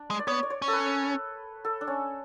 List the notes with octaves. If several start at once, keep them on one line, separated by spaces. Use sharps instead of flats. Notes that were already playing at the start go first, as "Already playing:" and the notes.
Already playing: D4
G#3
D5
B3 C#5
D5
C#5
C#4
A4
B4
A4
D4
C#4